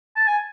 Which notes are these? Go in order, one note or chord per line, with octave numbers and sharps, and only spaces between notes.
A5
G#5